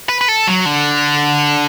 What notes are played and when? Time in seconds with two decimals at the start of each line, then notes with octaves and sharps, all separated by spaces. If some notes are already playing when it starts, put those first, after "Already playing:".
0.09 B4
0.21 B4
0.28 A4
0.47 F#3
0.66 D3